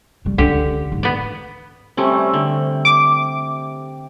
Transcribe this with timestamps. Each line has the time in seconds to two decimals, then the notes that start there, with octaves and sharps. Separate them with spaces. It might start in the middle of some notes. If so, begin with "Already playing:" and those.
0.25 C#3 G3
0.38 C#2 D3 E3 G4
0.92 G#2
1.03 B3 D5
1.97 C3 G3 A3 C4 C#4
2.34 D3
2.85 D6